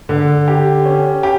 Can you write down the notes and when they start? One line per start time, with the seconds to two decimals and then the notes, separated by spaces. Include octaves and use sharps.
0.09 D3
0.48 G4
0.85 C#4
1.23 G4